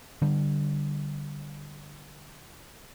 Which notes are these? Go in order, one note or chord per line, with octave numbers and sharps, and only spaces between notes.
D3 G3